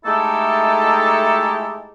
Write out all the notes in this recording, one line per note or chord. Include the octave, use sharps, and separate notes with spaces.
G#3 A3 D#4 E4 G4 A4